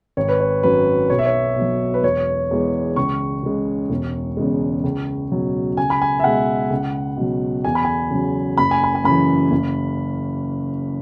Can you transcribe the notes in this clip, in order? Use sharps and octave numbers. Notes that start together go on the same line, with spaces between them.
G#1 C#5
B4
C#5
F#2 F#3 B4
B1 C#5
E5
C#5
B2
F#3
B4
E1 C#5
E2 E3 G#3
C#2 C#6
C#3 G#3
E1
E2 C#3 G#3
C#2
B2 F#3
C#2 G#5
B5
G#5
E5
B2 G#3 F#5
C#2
B2 F#3
E2 G#5
B5
G#5
C#3 F#3
F#1 B5
G#5
B5
G#5
F#2 C#3 E3 B5
F#1